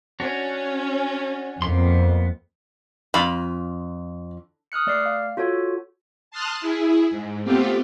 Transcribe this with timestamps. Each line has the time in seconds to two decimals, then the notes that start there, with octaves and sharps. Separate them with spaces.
0.20 C#4 D4 F#4 C#5
1.62 F2 A#3 B3 C6
3.14 F2 F4 B5
4.72 D#6 F6 F#6 C#7
4.87 A3 D5 F6 C7
5.06 F5
5.37 F4 F#4 A4 C#5
6.31 A5 C6 D#6 F6 F#6
6.61 E4 G#4
7.11 G#2
7.44 A3 B3 C4 F4 G4